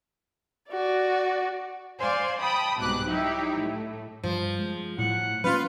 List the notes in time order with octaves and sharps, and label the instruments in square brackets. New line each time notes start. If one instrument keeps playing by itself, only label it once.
[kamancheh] F#4 D5
[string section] C5 D5 F5 G#5 C6
G5 A5 B5 D#6
C2 G#2 B2 F#3 D6 F#6
F#3 D#4 E4 G4
A2 A3
[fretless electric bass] G2 [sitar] F3
[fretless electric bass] G#3
[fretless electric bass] A2 F#3 [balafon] E4 [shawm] F#5
[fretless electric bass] F#3 G3 A#3 [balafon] C#4 [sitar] F4 B4 [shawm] F5